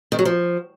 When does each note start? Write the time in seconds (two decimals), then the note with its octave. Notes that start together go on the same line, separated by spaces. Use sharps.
0.12 D#3
0.19 F#3
0.25 F3